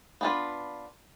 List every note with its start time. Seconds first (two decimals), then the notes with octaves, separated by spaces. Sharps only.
0.21 B3 D4 F4 B4